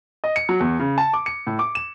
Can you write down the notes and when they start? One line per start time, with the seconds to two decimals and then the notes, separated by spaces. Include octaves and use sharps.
0.24 D#5
0.36 C#7
0.49 F#3
0.60 E2
0.80 C#3
0.98 A5
1.13 D6
1.26 C#7
1.47 A2
1.59 D6
1.75 E7